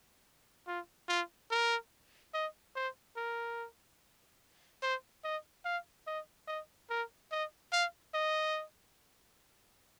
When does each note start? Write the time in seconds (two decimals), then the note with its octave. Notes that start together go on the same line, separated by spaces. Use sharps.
0.67 F4
1.09 F4
1.51 A#4
2.34 D#5
2.75 C5
3.17 A#4
4.83 C5
5.24 D#5
5.65 F5
6.07 D#5
6.48 D#5
6.90 A#4
7.31 D#5
7.72 F5
8.14 D#5